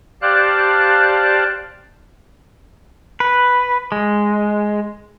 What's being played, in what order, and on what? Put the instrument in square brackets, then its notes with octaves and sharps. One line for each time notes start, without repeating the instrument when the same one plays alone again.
[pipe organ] G4 C5 D5 F5 A5 F#6
[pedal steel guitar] B4
G#3